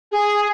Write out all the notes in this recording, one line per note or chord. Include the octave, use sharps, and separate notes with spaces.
G#4